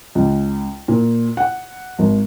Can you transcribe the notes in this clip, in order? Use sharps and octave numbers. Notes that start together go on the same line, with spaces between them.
C#2
A#2
F#5
G#1